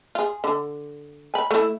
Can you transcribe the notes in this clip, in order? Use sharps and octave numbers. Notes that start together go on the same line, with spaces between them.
F4 G#4
D3
G#5 B5
A3 E4